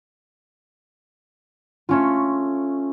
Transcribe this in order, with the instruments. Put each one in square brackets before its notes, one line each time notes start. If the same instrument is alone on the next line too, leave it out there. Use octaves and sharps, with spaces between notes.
[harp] A3 C#4 F4